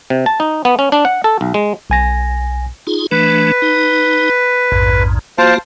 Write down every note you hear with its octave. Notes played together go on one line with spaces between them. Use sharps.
C3
A5
D#4
B3
C#4
D4
F#5
A4
B1
G#3
B1 G#5 A#6
D#4 F4 G#4
E3 A3 D4 B4
D#4
A#1 F2 G#2
A#3 F4 F#4 C5 F5 A5